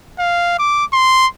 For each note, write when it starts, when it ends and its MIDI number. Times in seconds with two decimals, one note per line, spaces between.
0.19 0.55 77
0.58 0.85 86
0.93 1.27 84